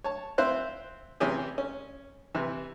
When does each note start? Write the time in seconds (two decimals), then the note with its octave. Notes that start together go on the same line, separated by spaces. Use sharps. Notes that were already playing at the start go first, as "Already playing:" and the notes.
0.04 C#5 A5
0.38 C4 E4 C5 F5 F#6
1.20 C3 E3 C#4 G4 G#4
1.58 C#4
2.35 C3 E3